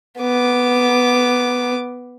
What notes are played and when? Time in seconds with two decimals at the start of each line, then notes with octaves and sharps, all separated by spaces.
0.20 B3 D6